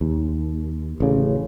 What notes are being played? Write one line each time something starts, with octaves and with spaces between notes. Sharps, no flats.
D#2
A1 C#3